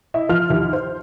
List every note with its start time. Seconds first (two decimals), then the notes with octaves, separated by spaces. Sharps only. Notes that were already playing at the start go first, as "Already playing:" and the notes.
0.14 E4 D#5 E5
0.29 F3 F4 F6
0.50 D#2 F3 E4 G4
0.73 C5